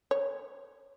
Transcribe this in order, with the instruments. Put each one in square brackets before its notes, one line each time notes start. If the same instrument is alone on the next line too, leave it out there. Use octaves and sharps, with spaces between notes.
[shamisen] C#5